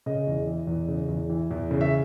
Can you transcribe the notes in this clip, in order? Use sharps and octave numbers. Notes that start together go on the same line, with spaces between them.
C#3 D#5
E2
E3
E2
C#3
E2
E3
E2
C#3
E5